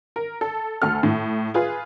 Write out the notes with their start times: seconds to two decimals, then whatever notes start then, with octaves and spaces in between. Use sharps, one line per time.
0.16 A#4
0.41 A4
0.82 D2 A4 F6
1.03 A2
1.54 F4 G#4 B4